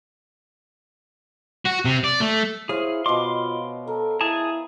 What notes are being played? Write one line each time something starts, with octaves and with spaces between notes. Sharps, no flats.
F#4
C3
D5
A3
E4 G#4 C5 C#5 F5
B2 F4 D#5 C6 D6
A4 A#4
E4 G#4 A5